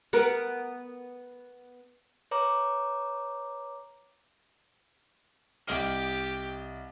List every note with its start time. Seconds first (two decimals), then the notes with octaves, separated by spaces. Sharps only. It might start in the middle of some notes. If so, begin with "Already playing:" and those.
0.13 B3 A#4
2.31 B4 C#5 A#5 D6
5.68 C2 G4 D#5 F6